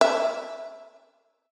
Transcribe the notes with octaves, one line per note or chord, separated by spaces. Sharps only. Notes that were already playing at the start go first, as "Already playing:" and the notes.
E5